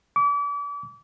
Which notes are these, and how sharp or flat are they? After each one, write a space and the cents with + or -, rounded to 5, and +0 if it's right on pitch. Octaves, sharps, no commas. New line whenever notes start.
D6 -35